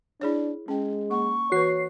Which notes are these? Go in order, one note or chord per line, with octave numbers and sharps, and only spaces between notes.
D4 E4 G#4 C#5
G#3 C#4 G5
A#3 F#5 C#6
E3 F#4 B4 C#5 C7